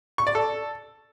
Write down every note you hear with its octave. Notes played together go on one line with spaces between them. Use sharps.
C#6
D5
A4